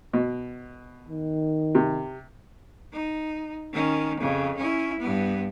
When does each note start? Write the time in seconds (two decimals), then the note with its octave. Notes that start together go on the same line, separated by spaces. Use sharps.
0.13 B2
1.08 D#3
1.75 C3
2.93 D#4
3.73 D#3 C#4
4.20 F2 C#3
4.57 C#4 E4
4.99 G2 B3